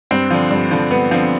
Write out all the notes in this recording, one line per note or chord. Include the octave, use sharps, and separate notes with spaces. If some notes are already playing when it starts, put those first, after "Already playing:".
G2 C4
D3 F3
G2
D3 F3
G2 B3
D3 F3 C4